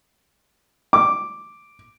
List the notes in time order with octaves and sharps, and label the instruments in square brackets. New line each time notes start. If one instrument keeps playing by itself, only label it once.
[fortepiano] D6